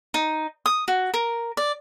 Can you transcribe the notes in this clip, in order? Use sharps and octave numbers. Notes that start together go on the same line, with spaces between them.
D#4
D#6
F#4
A#4
D5